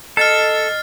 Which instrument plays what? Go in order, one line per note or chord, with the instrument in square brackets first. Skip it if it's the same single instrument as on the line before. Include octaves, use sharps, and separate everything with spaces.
[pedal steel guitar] A4 [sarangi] D#5 [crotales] F6 A6 C7